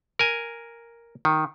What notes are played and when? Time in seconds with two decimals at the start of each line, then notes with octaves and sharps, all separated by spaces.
0.19 A#4 G#5
1.25 D#3